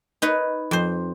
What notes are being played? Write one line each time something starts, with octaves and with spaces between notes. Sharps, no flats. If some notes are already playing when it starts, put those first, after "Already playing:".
D#4 B4 C#5
F2 C5